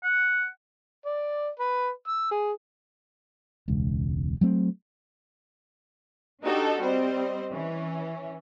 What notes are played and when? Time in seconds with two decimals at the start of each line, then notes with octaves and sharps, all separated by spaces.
0.04 F#5
1.06 D5
1.60 B4
2.08 E6
2.32 G#4
3.68 E1 C#2
4.41 F#3 A3 C4
6.43 D4 D#4 F#4 G4 A4
6.82 G3 C4 C5 D#5
7.54 E3 C#4